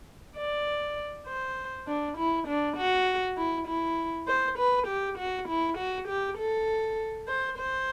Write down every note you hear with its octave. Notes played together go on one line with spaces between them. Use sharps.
D5
C5
D4
E4
D4
F#4
E4
E4
C5
B4
G4
F#4
E4
F#4
G4
A4
C5
C5